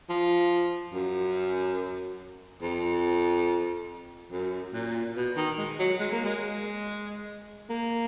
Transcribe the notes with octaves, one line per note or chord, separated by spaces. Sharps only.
F3
F#2
F2
F#2
A#2
B2
D#3
G#3
F#3
G#3
A#3
G#3
A#3